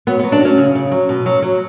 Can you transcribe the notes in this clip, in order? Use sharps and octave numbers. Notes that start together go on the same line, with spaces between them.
F#3 B3
F#3 B3
D4
F#3 C#4
C#3
C#3
F#3
B2
F#3
F#3